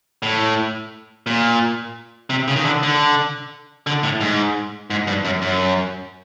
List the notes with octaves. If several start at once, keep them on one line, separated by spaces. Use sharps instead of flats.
A2
A#2
C3
C#3
D#3
D3
D3
D3
A2
G#2
G#2
G2
F#2
F#2